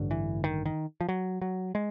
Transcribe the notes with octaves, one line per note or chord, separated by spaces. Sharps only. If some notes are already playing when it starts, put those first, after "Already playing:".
Already playing: A1 G2 D3
E3
D#3
D#3
F3
F#3
F#3
G#3